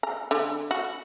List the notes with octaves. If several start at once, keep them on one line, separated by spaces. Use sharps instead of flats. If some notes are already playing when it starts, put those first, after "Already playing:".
A#5
D3
F#4